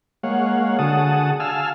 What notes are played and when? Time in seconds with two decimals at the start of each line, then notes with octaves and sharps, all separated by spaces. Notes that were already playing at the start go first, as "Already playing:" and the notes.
0.23 G#3 A#3 C#5 F5 F#5
0.79 D3 F#4 G#4 F#5 A5 D#6
1.40 F5 G#5 A5 E6 F6